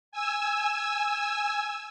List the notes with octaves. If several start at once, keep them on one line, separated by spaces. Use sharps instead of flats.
G#5 E6